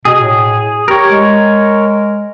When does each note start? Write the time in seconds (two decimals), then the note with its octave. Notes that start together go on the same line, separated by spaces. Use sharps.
0.05 B2 G#4
0.21 A2
0.88 G4 A#4 C#5
1.10 G#3